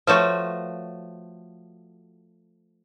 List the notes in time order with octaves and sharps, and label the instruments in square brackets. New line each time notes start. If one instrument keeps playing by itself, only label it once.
[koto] F3 A3 F#4 [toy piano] B4 C#5 F5